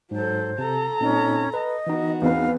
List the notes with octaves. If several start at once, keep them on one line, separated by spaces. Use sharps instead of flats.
G#2 F#3 A4 C5
C3 A4 A#5
A#2 C4 C#4 D#4
B4 D#5
E3 B3 D#4 F#4
E2 C4 B4 F5